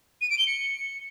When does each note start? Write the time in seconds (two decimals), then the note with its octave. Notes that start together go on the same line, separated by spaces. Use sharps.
0.21 D#7
0.30 D7
0.38 G7
0.47 C#7